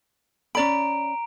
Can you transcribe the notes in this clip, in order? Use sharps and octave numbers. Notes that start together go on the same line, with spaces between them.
C#4 D5 A#5 B5 D7